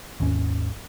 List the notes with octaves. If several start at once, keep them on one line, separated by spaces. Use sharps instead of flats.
G#1 D#2 C#4